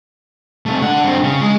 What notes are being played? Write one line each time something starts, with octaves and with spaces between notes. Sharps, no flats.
C3 A3
D3 F#5
G2 C4
C#3
G#3